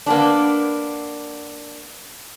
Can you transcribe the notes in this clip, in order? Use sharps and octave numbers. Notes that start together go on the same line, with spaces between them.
A#3 B3 D4